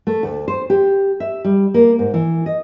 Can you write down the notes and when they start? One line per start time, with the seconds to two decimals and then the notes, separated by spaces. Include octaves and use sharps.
0.07 A3
0.23 D2
0.48 C5
0.70 G4
1.20 E5
1.45 G3
1.74 A#3
1.99 G#2
2.14 E3
2.46 D#5